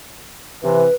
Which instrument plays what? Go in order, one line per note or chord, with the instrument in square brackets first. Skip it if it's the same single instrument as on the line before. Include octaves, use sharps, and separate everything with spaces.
[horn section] C3 E3 [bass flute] B4